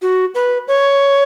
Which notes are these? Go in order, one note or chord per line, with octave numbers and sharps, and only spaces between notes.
F#4
B4
C#5